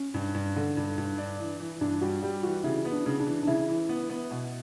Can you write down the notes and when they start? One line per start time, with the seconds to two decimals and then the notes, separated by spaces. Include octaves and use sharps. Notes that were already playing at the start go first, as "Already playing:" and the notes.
Already playing: C#4
0.14 G2
0.35 G2
0.56 D3
0.77 G2
0.98 G2
1.18 D4
1.39 E3
1.60 E3
1.81 G2 D4
2.01 G3 F#4
2.22 G3 G4
2.43 E3 F#4
2.64 C#3 E4
2.85 B3
2.92 D4
3.06 C#3
3.20 D4
3.27 E3
3.43 D4
3.47 C#3 E4
3.69 E3
3.89 B3
4.10 B3
4.31 B2